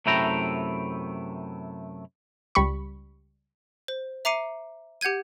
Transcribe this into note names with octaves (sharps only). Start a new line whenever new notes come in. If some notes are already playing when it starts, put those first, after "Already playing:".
F#2 C3 A3 E4 G5 A#5
C#2 G3 B5 C#6
C5
E5 A#5 D6 C7 C#7 D#7
G4 F#5 G6 G#6 D#7